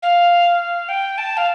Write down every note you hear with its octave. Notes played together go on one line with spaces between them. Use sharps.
F5
G5
A5
F5